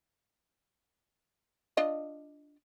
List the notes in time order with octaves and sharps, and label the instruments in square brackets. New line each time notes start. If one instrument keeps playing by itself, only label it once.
[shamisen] D4 F4 D#5